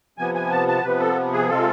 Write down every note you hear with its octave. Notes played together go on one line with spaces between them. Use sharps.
C3 F3 B3 G#5
G#5
A5
A5
C3 F3 B3 B4
A4
G#4
C3 G#3 C4 F4 A4